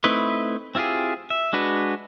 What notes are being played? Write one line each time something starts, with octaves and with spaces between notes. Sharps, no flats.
A3 C4 D#4 E4 B4
C4 E4 F4 G4 G#4
E5
G#3 D4 F#4 B4